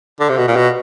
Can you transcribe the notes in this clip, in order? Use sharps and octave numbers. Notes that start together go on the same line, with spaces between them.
D3
C3
B2
A#2
B2